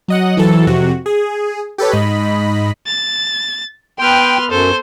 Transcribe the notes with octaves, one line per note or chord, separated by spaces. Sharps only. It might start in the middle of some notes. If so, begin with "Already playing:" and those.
F#3 D#5 F#5
E3 F#3 A4
F2 C3 F#4
G#4
G4 A4 B4 C#5
G#2 D#5 B5
A6
B3 B4 G5 C6 F6
F#2 A4 C5